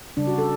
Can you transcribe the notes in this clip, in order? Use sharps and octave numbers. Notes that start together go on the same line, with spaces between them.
C#3 G3 D4
F#4
A4